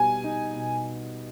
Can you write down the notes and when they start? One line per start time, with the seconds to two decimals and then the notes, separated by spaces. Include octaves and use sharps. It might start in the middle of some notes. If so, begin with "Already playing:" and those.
Already playing: B2 G3 B3 D#4 G#5
0.24 D#4
0.54 B2